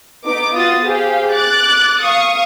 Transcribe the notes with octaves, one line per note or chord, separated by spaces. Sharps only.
B3 D#4 D6
B3 F4 F#4 D#6 A6
G4 G#4 C5 F5
D6 F#6 A6
F5 C#6 D#6